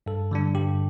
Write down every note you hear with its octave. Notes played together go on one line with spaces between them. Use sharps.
G2 A4
D3 G3 D4
G2 G4